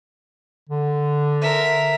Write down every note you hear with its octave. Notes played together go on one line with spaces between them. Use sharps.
D3
A#4 E5